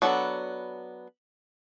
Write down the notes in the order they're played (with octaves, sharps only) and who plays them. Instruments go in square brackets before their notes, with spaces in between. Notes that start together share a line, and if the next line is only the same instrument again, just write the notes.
[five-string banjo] F#3 B3 D4 F#4 A4